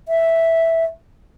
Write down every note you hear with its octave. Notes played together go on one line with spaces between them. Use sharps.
E5